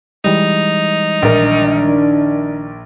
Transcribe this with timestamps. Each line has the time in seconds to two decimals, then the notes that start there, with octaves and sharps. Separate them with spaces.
0.24 E3 G3 G#3 D#4
1.22 A#1 D#3 D4 A#4